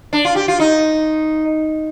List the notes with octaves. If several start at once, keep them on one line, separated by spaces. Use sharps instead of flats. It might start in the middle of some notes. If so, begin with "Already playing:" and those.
D4
F4
G4
F4
D#4